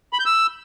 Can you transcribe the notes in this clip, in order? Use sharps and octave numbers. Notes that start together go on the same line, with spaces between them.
B5
G6
E6